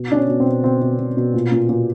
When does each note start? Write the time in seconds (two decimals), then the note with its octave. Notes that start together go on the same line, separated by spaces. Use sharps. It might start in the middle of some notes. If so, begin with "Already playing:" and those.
Already playing: B2
0.10 B2 D4
0.16 C#4
0.29 B2
0.40 C4
0.46 B2
0.64 B2 C4
0.82 B2
0.99 B2
1.17 B2
1.34 A#2
1.52 A#2
1.69 A#2